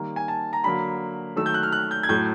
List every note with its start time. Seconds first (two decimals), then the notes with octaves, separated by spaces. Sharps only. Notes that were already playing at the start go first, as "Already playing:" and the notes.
Already playing: D#3 G3 A#3
0.16 G#5
0.28 A5
0.53 A#5
0.64 D3 F#3 A#3 B5
1.36 D#3 F#3 A3 E6
1.46 G6
1.54 F#6
1.63 F6
1.72 F#6
1.91 G6
2.03 G#6
2.09 A2 F#3 A3 G6